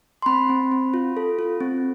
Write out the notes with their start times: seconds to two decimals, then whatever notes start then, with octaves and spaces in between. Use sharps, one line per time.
0.22 C6
0.26 C4 B5
0.50 C4
0.72 C4
0.94 F4
1.17 A4
1.39 F4
1.61 C4